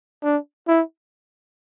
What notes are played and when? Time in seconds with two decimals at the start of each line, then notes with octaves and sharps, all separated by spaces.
0.24 D4
0.68 E4